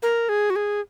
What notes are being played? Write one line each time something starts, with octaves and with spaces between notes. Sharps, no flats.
A#4
G#4
F#4
G#4